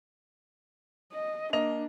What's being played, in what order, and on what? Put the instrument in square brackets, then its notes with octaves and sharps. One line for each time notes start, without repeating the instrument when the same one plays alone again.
[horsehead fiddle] D#5
[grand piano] A#3 D#5 F7 [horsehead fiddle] D4